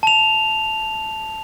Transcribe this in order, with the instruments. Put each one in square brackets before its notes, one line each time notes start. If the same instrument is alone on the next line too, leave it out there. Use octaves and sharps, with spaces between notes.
[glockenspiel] A5 F7